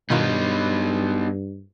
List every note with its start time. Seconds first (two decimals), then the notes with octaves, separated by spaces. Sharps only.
0.10 G2 B2 D#3 B3 D#4 F4